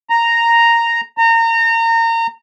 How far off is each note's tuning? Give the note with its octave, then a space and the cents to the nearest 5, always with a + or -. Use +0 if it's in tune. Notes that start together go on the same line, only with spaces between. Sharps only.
A#5 -5
A#5 -30